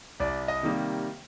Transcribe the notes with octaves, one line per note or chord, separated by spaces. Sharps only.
C2 D5
D#5
C3 D#3 G3 A#3